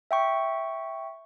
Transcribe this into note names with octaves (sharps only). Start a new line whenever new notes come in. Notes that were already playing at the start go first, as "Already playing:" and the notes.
E5 G5 C#6